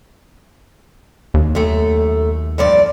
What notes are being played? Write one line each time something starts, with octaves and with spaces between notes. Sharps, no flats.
D#2
F#2 A3
G2 F3 D5